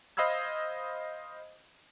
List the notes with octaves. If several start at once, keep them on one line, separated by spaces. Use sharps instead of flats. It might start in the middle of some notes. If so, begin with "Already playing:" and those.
C5 D#5 F5 B5 E6 G#6